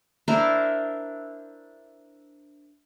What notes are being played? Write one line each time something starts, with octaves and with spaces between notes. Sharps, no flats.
D4 E4 A#4 C5